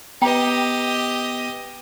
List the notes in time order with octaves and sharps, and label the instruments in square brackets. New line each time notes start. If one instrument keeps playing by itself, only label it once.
[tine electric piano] B3 B4 [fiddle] G4 D#5 [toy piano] G5 A#5